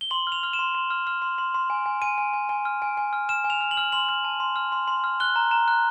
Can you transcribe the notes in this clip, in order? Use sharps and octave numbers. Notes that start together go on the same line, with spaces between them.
G7
C6 F#7
F6
F7
F6
E7
C6
C6
F6
F6
C6
C6
C6
G#5
G#5
G#5 D#7
G#5
G#5
G#5
F6
G#5
G#5
F6
F6 E7
G#5
F7
F6
F#7
F6
C6 F#7
F6
A5
C6
F6
C6
C6
F6
F#6 G7
A#5
A#5
F#6